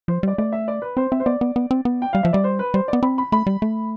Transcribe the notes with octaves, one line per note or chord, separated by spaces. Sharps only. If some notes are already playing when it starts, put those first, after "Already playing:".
F3 C5
G3 D5
A3 D5
E5
D5
B4
C4 C5
C4 E5
C5
B3 D5
B3
B3
C4
B3
G5
G3 F5
F3 E5
G3 D5
C5
B4
G3 C5
D5
B3
C4 B5
B5
A3 B5
G3
A3